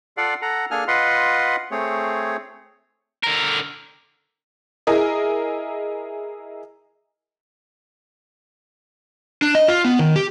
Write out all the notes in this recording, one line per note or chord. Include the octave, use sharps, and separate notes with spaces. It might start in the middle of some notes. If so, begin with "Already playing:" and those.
F4 A4 D5 F5 F#5
A4 F#5 A#5
A#3 D4 G#4 A4 G#5 F6
F4 B4 D#5 F#5 C6
A3 C4 G#4 C#5
D3 A#4
E4 G#4 A#4 D#5
D4
D#5
F4
B3
D#3
G4